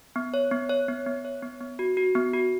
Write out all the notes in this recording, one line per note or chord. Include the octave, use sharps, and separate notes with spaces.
B3
C#5
B3
C#5
B3
B3
C#5
B3
B3
F#4
F#4
B3
F#4